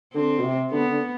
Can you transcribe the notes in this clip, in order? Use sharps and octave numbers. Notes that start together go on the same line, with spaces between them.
D3 C4
B2
C3
D3 B3
D3